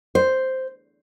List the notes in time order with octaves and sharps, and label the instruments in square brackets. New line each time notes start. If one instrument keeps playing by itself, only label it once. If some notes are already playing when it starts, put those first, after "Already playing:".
[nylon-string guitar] C5